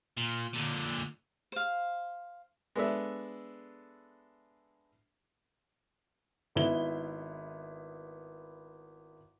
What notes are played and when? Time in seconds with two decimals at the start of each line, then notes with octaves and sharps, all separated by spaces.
0.17 A#2
0.54 A#2 D3
1.52 C5 F5
2.76 G#3 B3 D4 A4 E5
6.55 G#1 B3 E4 G7